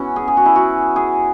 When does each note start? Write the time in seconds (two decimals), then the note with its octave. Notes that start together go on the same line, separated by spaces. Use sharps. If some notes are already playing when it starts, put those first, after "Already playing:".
Already playing: B3 C#4 E4 F#4
0.16 G#4
0.28 G#4
0.37 F#4
0.46 E4
0.56 F#4
0.96 G#4